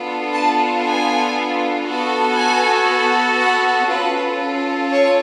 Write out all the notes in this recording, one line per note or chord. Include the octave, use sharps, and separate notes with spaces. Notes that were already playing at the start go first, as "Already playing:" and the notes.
Already playing: B3 D4 F4 A4
A5
G#5
B3 F#4 A4
G#5
F#5
C#4 F4 A4 B4
C#5